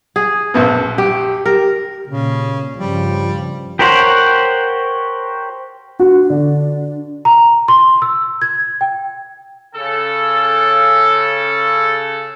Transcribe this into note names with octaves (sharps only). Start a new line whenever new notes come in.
G#4
A#1 F#2 B2
G4
G4 A#4
A#2 C#3
G2 C#3 F3 G3
G4 A#4 C5 C#5 F#5
D4 F#4
D3
A#5
C6
E6
G#6
G5
C#3 A4